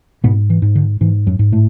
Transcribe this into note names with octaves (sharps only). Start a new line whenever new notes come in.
G#2 B2 B3
E3
G#2
D3
G#2 E3
F#2 F#3
G#2
A2 A3